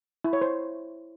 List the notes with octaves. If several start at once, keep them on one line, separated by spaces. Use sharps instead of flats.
E4
C#5
C5